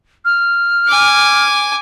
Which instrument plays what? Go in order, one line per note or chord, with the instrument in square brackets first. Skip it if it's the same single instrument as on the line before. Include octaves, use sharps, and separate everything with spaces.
[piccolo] F6
[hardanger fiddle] G#5 D6